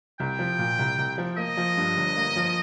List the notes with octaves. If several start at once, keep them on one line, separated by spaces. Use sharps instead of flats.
C2 G5
F3
A#2
C2
C2
F3
A#3 D#5
F3
G2
G1
A#3
F3